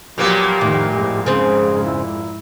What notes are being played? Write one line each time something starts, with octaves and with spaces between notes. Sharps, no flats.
A#2 F3 F#3 A#3 B3 G4
F2 A2 D#3
F2 G#2 G#3
C#3 C4 G#4
E4